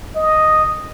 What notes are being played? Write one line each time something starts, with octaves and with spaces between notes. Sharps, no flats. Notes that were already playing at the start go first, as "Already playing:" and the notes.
D#5